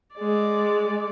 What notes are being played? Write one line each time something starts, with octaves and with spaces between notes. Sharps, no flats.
G#3 D5